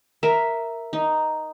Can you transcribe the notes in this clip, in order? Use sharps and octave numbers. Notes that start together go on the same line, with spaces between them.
A#4 E5
D#4